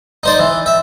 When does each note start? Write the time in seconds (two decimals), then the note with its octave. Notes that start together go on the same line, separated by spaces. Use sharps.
0.23 D#4 C5 D5
0.39 E3
0.66 E5